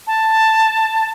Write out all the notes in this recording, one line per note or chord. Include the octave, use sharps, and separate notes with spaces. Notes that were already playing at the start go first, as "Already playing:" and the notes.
A5